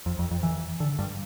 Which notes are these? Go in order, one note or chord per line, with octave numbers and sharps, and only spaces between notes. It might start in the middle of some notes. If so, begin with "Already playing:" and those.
F2
F2
F2
E3
D3
G2